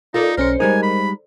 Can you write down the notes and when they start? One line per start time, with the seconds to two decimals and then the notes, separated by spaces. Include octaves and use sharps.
0.14 D#4 F4 A4 A#4 D5
0.37 B1 C#4 A#4 C5 C#7
0.60 G3 G#3 D#4 A#4 G#5
0.83 B5